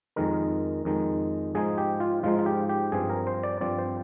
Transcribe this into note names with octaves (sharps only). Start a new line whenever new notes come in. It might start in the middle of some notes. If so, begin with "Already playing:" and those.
F2 D#3 G#3 D#4 A#4
F2 D#3 G#3 D#4
G#2 F3 G#3 D#4 G#4
G4
F4
G#2 F3 G#3 D#4 F4
F4
G4
G4
G2 F3 C4 G#4
A#4
C5
D5
G2 F3 C4 D5
C5